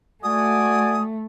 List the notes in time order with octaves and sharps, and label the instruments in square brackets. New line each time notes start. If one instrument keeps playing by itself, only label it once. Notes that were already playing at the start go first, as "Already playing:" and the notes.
[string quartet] A3 [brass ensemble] F#4 D5 G#5 [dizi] D#6